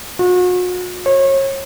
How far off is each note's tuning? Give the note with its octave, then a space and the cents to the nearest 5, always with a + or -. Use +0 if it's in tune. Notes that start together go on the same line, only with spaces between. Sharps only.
F#4 -40
C#5 -35